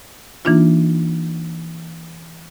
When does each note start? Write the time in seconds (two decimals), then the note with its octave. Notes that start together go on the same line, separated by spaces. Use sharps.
0.45 E3 A#3 D4 D#4 F4